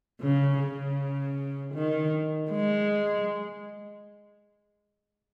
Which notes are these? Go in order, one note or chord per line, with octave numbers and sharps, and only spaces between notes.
C#3
C#3
D#3
G#3